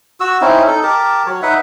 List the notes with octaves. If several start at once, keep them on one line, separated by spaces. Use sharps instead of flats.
F#4 E6
C4 C#4 D#4 E4
D#4 A4
G4 A#4 A5
F#3 C#5
D#4 B4 E5 F#5